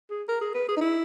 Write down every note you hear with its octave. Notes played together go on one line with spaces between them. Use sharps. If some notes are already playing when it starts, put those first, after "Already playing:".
G#4
A#4
G#4
B4
G#4
D#4
E4